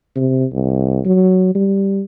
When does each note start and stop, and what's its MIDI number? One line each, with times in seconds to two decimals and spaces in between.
0.16 0.45 48
0.53 1.00 36
1.05 1.53 54
1.55 2.02 55